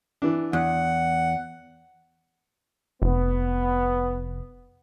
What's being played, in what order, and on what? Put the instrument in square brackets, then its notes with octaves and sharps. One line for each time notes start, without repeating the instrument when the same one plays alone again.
[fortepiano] E3 D4
[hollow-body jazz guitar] E2 [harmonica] F#5
[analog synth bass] F1 [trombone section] B3